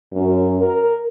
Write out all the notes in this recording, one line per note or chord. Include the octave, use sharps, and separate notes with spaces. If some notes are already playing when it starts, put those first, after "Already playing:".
F#2
A#4